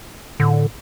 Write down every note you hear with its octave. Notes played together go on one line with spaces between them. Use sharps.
A2 D3